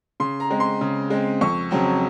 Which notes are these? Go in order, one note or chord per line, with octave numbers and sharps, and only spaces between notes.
C#3 C6
A#5
G#3 C4
C6
C#3
G#3 C4
F2 C#6
C#3 F#3 C4